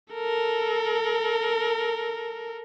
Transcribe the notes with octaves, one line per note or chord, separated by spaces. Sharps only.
A4 A#4